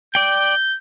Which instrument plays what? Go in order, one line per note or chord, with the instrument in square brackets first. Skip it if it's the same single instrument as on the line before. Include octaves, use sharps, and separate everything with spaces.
[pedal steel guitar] D5 G5 [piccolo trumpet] G6